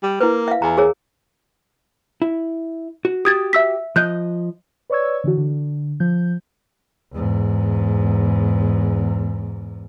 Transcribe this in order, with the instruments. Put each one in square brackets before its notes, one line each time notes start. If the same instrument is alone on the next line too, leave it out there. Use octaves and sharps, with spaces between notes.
[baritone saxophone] G3
[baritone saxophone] A#3 [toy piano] E4 B4
[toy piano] E5 F5
[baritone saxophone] E2 [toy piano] A#5
[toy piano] G#4 A#4 C#5
[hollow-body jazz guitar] E4
F#4
[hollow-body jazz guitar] F#4 G4 [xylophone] D#6 G#6 A6
[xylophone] E5 E6 B6
[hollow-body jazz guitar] F3 D#5 [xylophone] F#6 G6
[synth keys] B4 C#5 D5 C#6 E6 G#6
D3 E3 F#4
D3
F3 G6
[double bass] E2 G#2